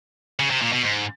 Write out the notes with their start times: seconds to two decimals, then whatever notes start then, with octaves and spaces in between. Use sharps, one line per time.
0.40 C#3
0.51 C3
0.62 A#2
0.73 B2
0.83 G#2